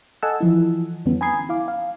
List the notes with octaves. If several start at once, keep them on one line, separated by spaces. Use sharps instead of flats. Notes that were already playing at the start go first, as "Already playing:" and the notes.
A4 D#5 F#5 G#5 A5 E6
E3 F3 E4
F2 D3 E3 G3 B3 C#4
G#5 A#5 B5 D#6 G#6 C7
E4 F5 D6
F5